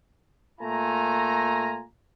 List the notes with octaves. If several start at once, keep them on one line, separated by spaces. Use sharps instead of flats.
A#2 A3 F4 G#5 A#5